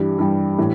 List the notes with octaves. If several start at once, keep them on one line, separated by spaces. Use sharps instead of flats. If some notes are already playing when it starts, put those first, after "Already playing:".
Already playing: G2 E3 G3 D4 G4
G2 E3 G3
A2 E3